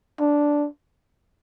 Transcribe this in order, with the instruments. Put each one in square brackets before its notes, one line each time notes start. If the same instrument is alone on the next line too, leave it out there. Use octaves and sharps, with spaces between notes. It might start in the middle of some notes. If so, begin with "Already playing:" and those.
[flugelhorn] D4